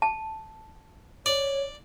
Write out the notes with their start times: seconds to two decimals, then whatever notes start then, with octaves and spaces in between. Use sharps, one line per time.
0.02 A5
1.26 C#5 D5